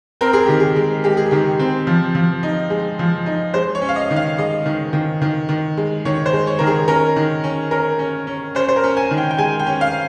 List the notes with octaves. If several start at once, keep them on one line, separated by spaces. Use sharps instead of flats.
C4 A#4
G#4
D#3 G4
G#4
G#3
G#3 G4
G#4
D#3 G4
C4
F3
F3
D#4
G#3
F3
D#4
G#3 C5
C#5
C#4
F5
D#5
D#3
F5
G#3 D#5
D#3
D#3
D#3
D#3
G#3
D#3 C#5
C5
G#3
C#5
D#3 A#4
G#4
C#4 A#4
D#3
C#4
C#4 A#4
C#4
C#4
C#4 C5
C5
A#4
C#4
G#5
D#3
G5
G5
G#3 G#5
G5
C#4
F5